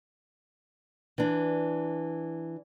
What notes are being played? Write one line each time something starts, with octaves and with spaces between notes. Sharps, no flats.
E3 D4